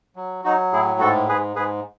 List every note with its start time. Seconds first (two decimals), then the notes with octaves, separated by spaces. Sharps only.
0.16 F#3
0.44 F#3 D#4 F#4
0.72 A2 E4 G#4
1.00 G#2 F#4 A4
1.29 G#2 G#4 B4
1.56 G#2 G#4 B4